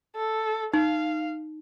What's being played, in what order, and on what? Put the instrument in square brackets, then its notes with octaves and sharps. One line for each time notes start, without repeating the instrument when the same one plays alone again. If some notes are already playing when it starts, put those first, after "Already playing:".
[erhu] A4
[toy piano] D#4 [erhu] F5